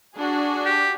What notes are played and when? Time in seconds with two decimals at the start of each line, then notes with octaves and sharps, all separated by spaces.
0.16 D4 F#4 G#4
0.65 G4